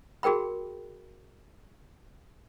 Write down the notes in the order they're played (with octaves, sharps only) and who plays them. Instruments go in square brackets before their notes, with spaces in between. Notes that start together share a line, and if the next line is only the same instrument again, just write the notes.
[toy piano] F#4 G#4 A#4 G5 B5